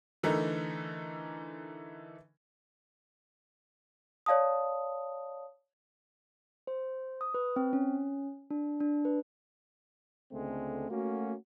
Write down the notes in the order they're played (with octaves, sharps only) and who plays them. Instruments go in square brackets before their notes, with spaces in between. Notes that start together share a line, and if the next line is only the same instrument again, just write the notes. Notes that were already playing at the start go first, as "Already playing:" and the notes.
[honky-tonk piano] D3 E3 A3 D#4 A#4
[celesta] C#5 D5 F5 A5 D#6
[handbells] C5
D#6
B4
C4
C#4
D4
D4
B4
[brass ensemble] C#2 D3 G#3 A3 C4
A3 A#3 C#4 F#4